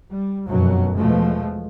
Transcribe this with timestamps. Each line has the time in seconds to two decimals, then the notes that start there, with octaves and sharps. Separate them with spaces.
0.11 G3
0.47 F1 F#2 B2 F#3
0.97 E2 B2 F3 G#3 A3